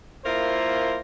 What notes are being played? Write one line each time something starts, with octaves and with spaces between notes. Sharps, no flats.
A#3 E4 F4 A#4 C5